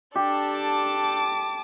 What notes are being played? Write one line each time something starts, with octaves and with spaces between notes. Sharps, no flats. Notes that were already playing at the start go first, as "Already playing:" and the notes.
D4 G4 A4
A5 D6